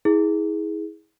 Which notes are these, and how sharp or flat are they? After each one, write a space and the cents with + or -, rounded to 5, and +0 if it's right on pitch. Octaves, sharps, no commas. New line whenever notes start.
E4 -35 G#4 +0